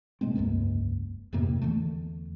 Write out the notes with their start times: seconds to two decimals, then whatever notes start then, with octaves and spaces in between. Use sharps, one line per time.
0.21 B2 G#3 A3 C4
0.36 F1 C#2 G2 A#3
1.33 F2 G#2 C3 A#3
1.62 E2 D3 E3 A3